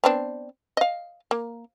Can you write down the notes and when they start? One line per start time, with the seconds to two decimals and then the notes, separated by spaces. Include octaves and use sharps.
0.04 B3 C4 D4
0.77 D#5 F5
1.31 A#3